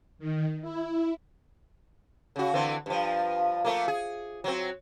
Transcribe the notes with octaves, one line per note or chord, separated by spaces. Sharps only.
D#3
E4
C#3 F#4
D3 E3 C4
G2 F3
F3 A3 A#3
G#4
F#3 C4